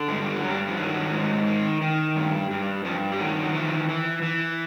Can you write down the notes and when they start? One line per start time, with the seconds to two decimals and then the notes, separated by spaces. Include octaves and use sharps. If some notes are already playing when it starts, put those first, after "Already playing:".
Already playing: D3
0.08 G2 G#3
0.22 G3
0.36 F#3
0.43 G2
0.50 G3
0.68 F3
0.77 D#3 F#3
1.12 G#2
1.46 D#3
1.82 D#3
2.16 G2
2.51 G2
2.85 G2 F3
3.12 G3
3.19 D#3 F#3
3.43 F#3
3.54 E3 F3
3.89 E3
4.23 E3